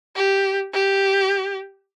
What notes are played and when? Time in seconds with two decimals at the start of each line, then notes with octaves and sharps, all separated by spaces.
0.16 G4
0.73 G4